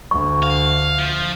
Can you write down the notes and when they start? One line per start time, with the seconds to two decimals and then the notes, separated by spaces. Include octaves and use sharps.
0.11 D2 C#6
0.43 F5
0.99 F3